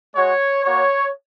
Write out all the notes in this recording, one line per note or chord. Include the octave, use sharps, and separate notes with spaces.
G#3 F#4 C#5
A#3 F#4 C#5